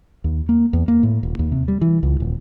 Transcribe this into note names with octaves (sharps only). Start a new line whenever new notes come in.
D#2
A#3
E2
A#3
A2
D#1
D#2
C3
G3
E3
C#2
D#1